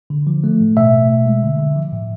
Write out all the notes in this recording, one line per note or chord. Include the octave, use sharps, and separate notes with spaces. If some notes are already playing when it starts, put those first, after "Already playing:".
D3
F3
A3
A2
B2 E5
A3
B2
G#3
D3
D3
F3
A2